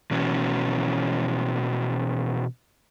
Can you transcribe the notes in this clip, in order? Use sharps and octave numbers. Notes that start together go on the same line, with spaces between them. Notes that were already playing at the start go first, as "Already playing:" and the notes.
B2 E3 C#4 F#4